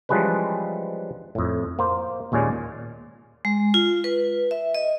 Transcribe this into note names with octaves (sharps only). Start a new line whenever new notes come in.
E3 F3 G3 G#3 C#4 B4
F2 A2
A#3 C5
D#2 A#2 G#3 C#4 D5
G#3
F4
B4
E5
D#5